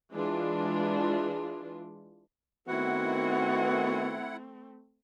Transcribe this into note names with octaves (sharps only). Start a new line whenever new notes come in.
E3 G#3 D4 F4
D#3 A3 B3 C4 E4 F#4 F#5